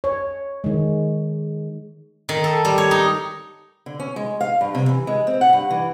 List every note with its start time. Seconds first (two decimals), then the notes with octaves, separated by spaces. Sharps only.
0.04 C#5
0.64 D#3 G#3
2.29 D#3
2.44 A4
2.65 G3
2.78 C#5
2.91 D#4
3.86 D3
4.00 C#4
4.16 G#3
4.41 F5
4.61 G2
4.75 C3
4.89 E3
5.07 G#3
5.27 C4
5.41 F#5
5.53 G2
5.70 E3